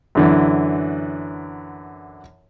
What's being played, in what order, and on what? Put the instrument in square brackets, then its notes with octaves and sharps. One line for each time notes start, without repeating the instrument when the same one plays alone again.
[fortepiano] F#2 D3 E3